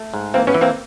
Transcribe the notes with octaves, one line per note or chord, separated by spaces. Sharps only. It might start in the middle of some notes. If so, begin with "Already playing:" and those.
Already playing: A3
G#2
E3 A#3 C4
B3 C#4
E3
A#3 C4